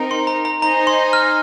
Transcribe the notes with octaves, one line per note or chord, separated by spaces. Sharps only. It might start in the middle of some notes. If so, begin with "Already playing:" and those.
Already playing: C4 D#4 A#4
C6
A#5
A#5
D#4 C5 D#5 G#5 A#5
C6
F6